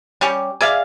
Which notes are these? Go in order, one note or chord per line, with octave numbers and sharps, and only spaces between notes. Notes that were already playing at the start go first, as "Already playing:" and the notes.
G3 C#4 G4
G#4 D5 E5 F5